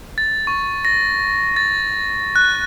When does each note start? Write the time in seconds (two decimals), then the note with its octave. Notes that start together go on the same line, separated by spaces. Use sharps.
0.18 A6
0.47 C#6
0.85 A#6
1.56 A6
2.36 F#6